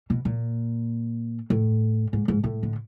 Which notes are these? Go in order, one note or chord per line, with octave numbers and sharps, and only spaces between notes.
B2
A#2
A2
G#2
G#2
A2
D3